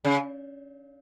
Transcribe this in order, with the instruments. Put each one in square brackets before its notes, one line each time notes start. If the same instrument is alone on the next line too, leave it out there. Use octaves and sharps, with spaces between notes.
[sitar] C#3